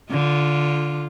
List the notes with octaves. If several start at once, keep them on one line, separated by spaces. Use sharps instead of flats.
D3 F4